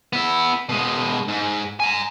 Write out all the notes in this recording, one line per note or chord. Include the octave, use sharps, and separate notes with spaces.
B3 E4
B2 G#3
G#2
G#5 A#5